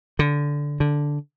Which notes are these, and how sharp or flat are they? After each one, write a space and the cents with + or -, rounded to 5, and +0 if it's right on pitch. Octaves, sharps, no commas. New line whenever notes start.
D3 -10
D3 -5